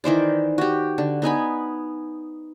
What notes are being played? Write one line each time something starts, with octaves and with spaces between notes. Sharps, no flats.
D#3 E3 C5 D5
F#4 G4
D3
B3 D#4 G#5 B5